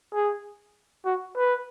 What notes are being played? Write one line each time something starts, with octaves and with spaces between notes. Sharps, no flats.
G#4
F#4
B4